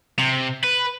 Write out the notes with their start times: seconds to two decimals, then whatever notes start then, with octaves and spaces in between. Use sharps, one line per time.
0.19 C3
0.64 B4